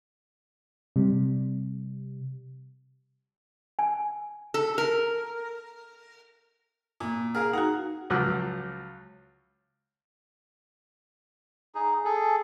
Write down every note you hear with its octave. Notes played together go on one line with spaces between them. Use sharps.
C3 G3
G#5
A4
A#4
A#2
G#4 A#4 F5 F6
D#4 F#4 F#5 A#5
C#2 F3 F#3 D6 E6 F#6
D#4 G#4
G#4 A4